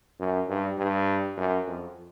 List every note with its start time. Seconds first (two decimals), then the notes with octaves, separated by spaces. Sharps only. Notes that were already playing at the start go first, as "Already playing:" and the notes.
0.19 F#2
0.49 G2
0.78 G2
1.37 F#2
1.67 F2